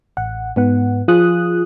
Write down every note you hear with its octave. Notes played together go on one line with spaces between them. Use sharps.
A1 F#5
G#2 B3 F#5
F3 F4 G#4 D#6 F#6